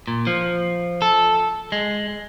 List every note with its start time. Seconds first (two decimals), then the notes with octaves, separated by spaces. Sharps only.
0.08 A#2
0.27 F3
1.02 A4
1.72 G#3